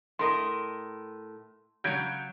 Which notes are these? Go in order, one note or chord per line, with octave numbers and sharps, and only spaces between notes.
A2 A#4 D#5 C6
C#3 F#3 G6 G#6 D7